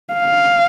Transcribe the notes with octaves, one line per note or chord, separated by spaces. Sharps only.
F5